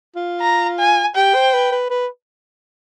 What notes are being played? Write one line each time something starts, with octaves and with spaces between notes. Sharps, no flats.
F4
A#5
G#5
G4 G5
C5
B4
B4
B4